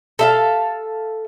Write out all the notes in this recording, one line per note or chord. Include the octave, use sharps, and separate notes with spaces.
A4 E5 F5